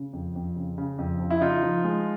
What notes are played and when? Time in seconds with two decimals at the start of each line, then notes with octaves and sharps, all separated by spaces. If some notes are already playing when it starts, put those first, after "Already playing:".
Already playing: C#3
0.13 F2
0.36 F2
0.56 C#3
0.78 C#3
0.98 F2
1.20 F3
1.30 E4
1.41 C#3 D#4 F4
1.62 F3
1.84 G#3